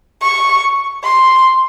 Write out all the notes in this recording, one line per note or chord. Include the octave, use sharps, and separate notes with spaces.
C#6
C6